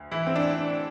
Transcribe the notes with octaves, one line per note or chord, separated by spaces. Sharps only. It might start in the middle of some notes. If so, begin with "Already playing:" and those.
Already playing: D2
E3 E4
C4
D4